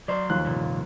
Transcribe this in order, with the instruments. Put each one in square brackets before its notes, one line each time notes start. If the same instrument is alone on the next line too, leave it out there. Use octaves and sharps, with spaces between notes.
[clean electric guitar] F#3 C5 [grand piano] D5
[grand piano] D#2 F3 F#6
[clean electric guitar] C2 G2 A#2